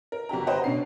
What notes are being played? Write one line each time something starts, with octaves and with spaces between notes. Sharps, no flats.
A#4
G1 F#4 G4 A#5
B4 C5 D#5 F#5 G5 A#5
B2 C#4 D4 C7